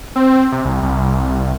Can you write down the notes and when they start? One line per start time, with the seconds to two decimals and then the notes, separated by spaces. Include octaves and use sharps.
0.16 C4
0.52 C3
0.65 C2
0.83 C2